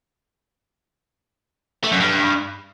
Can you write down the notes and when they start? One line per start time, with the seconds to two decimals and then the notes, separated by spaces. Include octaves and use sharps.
1.84 A3
1.92 F#2
2.00 G2